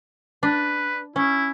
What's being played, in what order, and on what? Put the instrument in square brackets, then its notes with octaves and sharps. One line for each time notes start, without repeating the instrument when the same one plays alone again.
[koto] D4 [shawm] B4
[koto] C#4 [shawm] E4